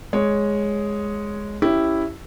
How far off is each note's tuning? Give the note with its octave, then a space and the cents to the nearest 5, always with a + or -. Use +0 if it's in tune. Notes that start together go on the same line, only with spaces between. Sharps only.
G#3 +0 C#5 +0
C#4 +0 E4 +0 G4 +0